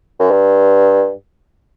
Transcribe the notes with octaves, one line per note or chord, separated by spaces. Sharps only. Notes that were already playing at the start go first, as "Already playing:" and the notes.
F#2
G2